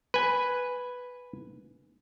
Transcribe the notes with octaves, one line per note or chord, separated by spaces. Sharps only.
B4 G#5